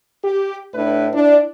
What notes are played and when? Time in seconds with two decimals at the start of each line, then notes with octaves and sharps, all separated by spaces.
0.24 G4
0.74 A2 D4 B4
1.13 D4 E4